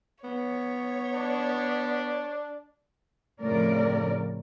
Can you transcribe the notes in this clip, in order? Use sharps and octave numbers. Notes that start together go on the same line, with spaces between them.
B3 C#5
D4 D5
F2 A2 C#3 A#4 D5